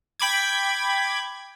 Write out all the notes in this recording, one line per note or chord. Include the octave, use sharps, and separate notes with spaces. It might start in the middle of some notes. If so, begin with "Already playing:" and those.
G5 B5 D6 G#6